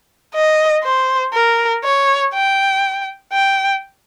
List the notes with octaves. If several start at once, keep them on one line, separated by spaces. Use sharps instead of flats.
D#5
C5
A#4
C#5
G5
G5